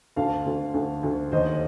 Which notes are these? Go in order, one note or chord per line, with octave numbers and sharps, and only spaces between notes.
D2 F5 A5
D2
D2
D2
D#2 C5 D#5